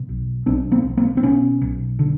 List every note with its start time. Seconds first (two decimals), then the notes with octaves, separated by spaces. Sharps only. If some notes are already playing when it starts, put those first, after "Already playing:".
Already playing: B2
0.09 B1
0.46 B1 C4 D4
0.71 A#3 C4
0.84 B1
0.97 A#3 C4
1.17 C4
1.23 B2 B3 C#4
1.62 B1
1.99 D3